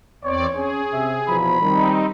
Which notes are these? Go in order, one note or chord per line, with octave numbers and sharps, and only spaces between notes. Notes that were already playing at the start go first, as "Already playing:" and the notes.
E2 C4 C#5 D5
C#4 G#4
C3 E5
E2 B2 F3 B5
D#3 G3 C4 D#4